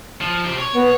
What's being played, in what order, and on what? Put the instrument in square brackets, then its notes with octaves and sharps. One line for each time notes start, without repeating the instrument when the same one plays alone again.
[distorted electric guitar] F3
G4 C5
C#5
[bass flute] B3